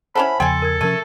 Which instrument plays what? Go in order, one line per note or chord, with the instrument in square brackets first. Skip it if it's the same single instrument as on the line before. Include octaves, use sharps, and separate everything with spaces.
[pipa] C#4 E4 A4 [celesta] C5 F#5 G#5 [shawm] B5
[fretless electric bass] E2 C#3 F3 [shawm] A4 [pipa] G5 G#5 [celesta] C6
[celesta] A#4 G#6
[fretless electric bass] C3 F3 C#4 [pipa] A3 [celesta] A#4 G#6 D#7